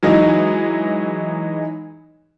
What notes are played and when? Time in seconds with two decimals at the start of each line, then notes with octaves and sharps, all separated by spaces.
0.03 E3 F#3 G#3 D#4